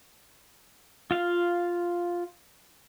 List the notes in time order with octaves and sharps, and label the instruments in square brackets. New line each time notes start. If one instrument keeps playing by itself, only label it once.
[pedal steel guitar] F4 F5